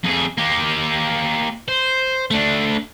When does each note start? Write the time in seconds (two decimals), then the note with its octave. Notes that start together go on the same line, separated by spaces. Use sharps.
0.04 F2 G#4
0.38 A#3 G4
1.68 C5
2.31 A3 D4